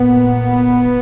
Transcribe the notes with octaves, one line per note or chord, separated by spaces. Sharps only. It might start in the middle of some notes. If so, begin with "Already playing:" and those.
Already playing: A#2 B3